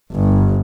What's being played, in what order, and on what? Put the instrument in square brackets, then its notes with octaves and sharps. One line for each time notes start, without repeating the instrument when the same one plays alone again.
[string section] G1